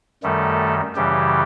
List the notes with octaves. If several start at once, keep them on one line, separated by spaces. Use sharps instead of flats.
F#2 D#3 G3 A3 A4
F#2 C#3 E3 G3 G4